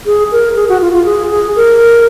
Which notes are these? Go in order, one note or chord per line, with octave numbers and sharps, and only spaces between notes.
G#4
A#4
G#4
F#4
F4
F4
G#4
G#4
A#4